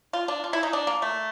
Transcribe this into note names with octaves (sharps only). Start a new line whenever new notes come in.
F4
D4
F4
E4
D#4
D4
A#3
A3